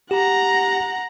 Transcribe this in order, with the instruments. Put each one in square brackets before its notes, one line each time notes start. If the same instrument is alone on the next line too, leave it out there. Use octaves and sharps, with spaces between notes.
[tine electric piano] G4 [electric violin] F#5 A#5